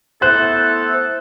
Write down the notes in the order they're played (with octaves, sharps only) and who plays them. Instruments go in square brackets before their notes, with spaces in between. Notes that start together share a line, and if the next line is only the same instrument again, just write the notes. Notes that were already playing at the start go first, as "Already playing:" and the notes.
[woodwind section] A3 B3 A4 [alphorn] E4 [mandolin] C5 [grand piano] F#6